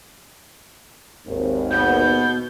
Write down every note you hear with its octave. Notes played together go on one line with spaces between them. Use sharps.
G#1 D#2
B2 B3 G6